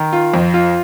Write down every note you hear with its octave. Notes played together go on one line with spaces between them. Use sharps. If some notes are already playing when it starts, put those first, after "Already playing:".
Already playing: D#3
F4
F2
F4